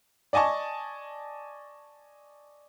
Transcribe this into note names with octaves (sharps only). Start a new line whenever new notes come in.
D5 D#5 G#5 A5 C#6